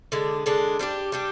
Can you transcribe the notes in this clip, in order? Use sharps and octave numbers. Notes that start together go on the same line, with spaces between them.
D3 G#3 D4
D3 G#3 D4
G3 D4 G4
G3 D4 G4